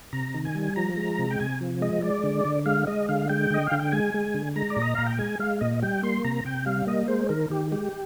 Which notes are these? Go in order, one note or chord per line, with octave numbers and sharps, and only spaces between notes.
C3 A#5
D#3
G#5
G3
F3 A#5
G#3
C3
G5
C3 G#5
F3
G#3 D#5
G#3 D5
D3
D3
G#3 F5
G#3 D#5
D3 F5
G#3 G5
D3 D#5
D3 F5
G5
G#3 G#5
G#3
D3
G#3 A#5
D5
A#2
D#5
A#2 F5
G5
G#3 G#5
G#3 F5
A#2 D#5
G3 G5
A#3 C6
C3 A#5
C3 G5
G3 F5
A#3 D#5
G#3 C5
D#3 A#4
D#3 G4
G#3 G4